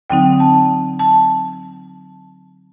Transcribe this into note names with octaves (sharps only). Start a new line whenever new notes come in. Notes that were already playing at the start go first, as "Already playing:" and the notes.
D3 F#3 C4 D#4 G5
A5
A5